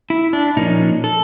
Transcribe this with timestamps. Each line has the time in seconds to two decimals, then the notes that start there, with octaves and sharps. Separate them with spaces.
0.10 E4
0.33 D4
0.56 A#2 F3 A#3 C#4 D#4
1.04 A4